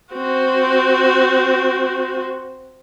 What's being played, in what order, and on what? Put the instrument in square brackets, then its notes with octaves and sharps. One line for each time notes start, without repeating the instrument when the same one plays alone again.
[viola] C4 F#4